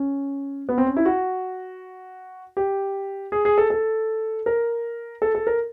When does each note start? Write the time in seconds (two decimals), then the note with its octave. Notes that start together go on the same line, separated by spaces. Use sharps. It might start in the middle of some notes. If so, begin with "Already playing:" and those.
Already playing: C#4
0.69 B3
0.78 C4
0.87 C#4
0.97 E4
1.05 F#4
2.57 G4
3.32 G#4
3.45 G#4
3.58 A4
3.70 A4
4.46 A#4
5.22 A4
5.35 A4
5.47 A#4